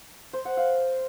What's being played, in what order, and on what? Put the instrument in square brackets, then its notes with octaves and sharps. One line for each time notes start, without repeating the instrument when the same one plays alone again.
[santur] C5
F#5
F5